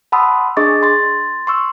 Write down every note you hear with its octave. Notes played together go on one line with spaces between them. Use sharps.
F#5 A5 B5 C6 D#6 E6
D4 G#4 D#5 C#6 D6 A6
C6 A6
C6 C#6 E6